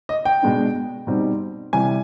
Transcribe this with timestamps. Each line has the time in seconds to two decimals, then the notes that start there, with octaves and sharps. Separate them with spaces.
0.09 D#5
0.25 G5
0.42 B2 G#3 B3 D4
1.07 B2 G3 C4 D#4
1.73 C3 E3 G3 G#5